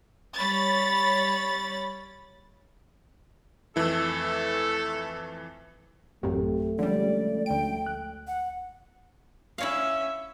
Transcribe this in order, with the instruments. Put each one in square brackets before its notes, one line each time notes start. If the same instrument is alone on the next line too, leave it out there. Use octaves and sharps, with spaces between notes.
[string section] G3 C#5 B5 A6
[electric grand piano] F2 E3 E4 [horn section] A3 A4
[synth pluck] A1 F#2 A2 [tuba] A3 [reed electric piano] C4 G4
[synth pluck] D3 G3 [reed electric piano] F3 G#3 C#4 [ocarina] D5
[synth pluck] D2 D7 [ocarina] G5
[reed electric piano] F#6
[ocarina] F#5
[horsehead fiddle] C#4 E5 [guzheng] E4 C#5 F5